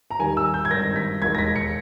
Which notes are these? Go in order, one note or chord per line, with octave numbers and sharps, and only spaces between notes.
A#5
D#2 D#3 G3 G#5
E6
G6
G#6
G#1 G2 D#3 A#6
B6
E1 D#2 D#3 G#3 G#6
A#6
B6
C#7